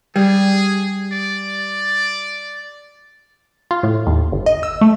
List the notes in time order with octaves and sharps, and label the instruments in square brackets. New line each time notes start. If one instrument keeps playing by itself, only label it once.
[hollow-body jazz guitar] G3 [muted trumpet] G#4
[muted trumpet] D5
[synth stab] F4
A2
D#2
G1
D#5
E6
A3